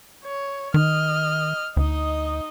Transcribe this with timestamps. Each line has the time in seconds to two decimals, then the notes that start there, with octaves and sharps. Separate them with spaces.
0.24 C#5
0.74 D#3 D#5 F6
1.77 D2 D#4 D#5